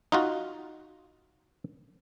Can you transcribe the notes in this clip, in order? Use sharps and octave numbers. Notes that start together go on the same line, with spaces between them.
D#4 F4 F#4